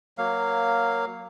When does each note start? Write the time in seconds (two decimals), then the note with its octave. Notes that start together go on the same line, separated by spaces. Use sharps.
0.18 F#3 A#3 F5